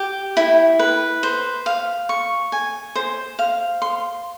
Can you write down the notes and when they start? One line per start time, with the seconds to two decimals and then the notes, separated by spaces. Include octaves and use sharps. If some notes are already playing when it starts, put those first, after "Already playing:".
Already playing: G4
0.37 E4
0.79 B4
1.23 C5
1.66 F5
2.09 C#6
2.52 G#5
2.96 C5
3.39 F5
3.82 C6